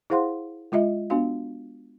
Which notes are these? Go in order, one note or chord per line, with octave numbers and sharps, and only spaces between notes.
E4 G#4 C5 F5 F#5 C6
G#3 F4 D#5 E5
B3 D4 F#4 F5